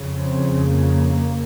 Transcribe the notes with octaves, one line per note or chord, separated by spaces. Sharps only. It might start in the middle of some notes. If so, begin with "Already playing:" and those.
Already playing: F2 C#3
C4
A#3